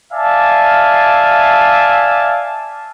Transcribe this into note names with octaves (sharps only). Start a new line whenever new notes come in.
D5 E5 F5 G#5 A5